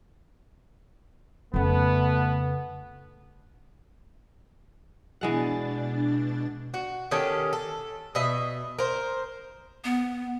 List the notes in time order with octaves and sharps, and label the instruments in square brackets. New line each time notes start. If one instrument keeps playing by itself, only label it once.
[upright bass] F2 C#3 [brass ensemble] A3 B3
[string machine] B2 D4 A6 [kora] E3 G#3 F#5
[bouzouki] F#4
D#3 C#4 G4 A4
A4
B2 D#5 E5
A#4 C5
[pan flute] B3